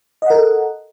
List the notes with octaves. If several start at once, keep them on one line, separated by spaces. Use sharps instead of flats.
A4 A#4 D#5 F#5